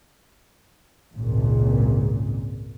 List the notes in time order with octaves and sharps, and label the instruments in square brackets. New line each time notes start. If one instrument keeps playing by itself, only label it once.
[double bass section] G#1 C#2 A#2